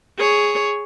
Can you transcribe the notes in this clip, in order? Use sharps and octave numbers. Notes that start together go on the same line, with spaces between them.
G#4 C#5